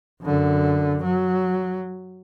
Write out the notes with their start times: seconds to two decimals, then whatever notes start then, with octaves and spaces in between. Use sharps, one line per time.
0.21 F#2 D3
1.04 F#3